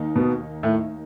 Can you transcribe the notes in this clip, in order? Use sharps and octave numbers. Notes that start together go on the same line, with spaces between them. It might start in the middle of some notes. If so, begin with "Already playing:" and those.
Already playing: D#2 D#3 D#4
B2 B3
A2 A3